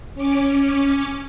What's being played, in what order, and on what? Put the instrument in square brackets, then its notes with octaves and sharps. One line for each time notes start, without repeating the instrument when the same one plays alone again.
[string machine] C#4 D6